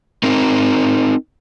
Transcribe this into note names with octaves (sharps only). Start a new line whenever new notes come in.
C4 D#4 A#4